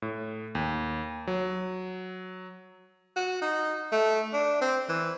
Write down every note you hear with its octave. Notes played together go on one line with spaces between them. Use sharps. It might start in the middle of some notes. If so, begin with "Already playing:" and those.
A2
D#2
F#3
F#4
D#4
A3
D4
C4
E3